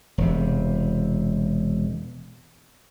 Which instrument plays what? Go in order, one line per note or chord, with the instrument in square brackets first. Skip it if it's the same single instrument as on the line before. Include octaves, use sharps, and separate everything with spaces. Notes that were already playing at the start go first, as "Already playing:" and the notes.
[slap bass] E1 C3